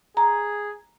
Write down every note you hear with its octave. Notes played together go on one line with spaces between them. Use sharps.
G#4 A#5